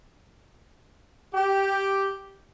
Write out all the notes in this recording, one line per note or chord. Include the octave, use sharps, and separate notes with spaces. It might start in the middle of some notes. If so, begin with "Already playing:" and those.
G4